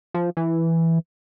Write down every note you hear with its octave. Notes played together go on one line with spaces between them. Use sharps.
F3
E3